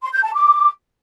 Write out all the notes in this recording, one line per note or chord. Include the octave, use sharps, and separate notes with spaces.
C6
G6
A5
D6